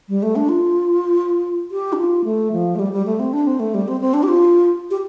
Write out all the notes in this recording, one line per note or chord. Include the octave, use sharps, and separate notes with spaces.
G3
A3
D4
F4
G4
D4
F4
A3
F3
A3
G3
G3
A3
C4
D4
C4
A3
G3
C4
C4
D4
G4
F4
G4